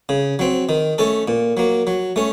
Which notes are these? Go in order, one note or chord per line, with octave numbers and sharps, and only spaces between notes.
C#3
F#3 C4
D#3
A3 C#4 A4
A#2
F#3 A#3
F#3
A3 C#4